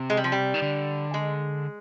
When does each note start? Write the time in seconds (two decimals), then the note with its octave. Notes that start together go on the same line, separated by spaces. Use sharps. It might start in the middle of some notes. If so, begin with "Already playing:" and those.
Already playing: C3
0.10 G#3
0.17 G3
0.24 F3
0.32 G3
0.54 D#3
0.62 D3
1.14 G#3